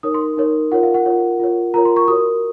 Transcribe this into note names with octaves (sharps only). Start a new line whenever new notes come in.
D#4 A#4 C#5 D#6
C6
D#4 A#4 C#5
F4 A#4 C#5 F#5
F5
F#5
F4 A#4 C#5
F4 A#4 C#5
F4 A#4 C#5 A#5
C6
C#6
F#4 A#4 C#5 D#6